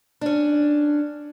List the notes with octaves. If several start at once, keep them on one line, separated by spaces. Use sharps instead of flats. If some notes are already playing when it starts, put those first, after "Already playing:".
C#4 D4